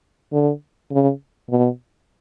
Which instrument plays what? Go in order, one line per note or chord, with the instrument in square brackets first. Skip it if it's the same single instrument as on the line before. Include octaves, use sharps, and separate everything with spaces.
[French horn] D3
C#3
B2